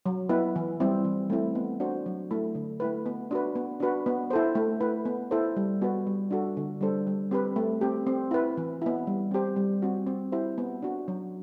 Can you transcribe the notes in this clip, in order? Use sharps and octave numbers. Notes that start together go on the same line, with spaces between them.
F#3
B3 E4 B4
E3
G3 C4 E4
E3
A3 C4 E4
B3
D4 F#4 C5
F#3
A3 E4
D3
A3 E4 B4
B3
D4 F#4 B4
B3
D4 F#4 B4
B3
E4 A4 C5
A3
E4 B4
B3
E4 A4 C5
G3
B3 F#4 B4
G3
D4 F#4 A4
D3
G3 D4 A4 C5
G3
C4 G4 B4
A3
C4 G4
C4
E4 B4
E3
B3 E4
G3
C4 G4 C5
G3
C4 F#4
C4
E4 G4 C5
B3
D4 F#4
F#3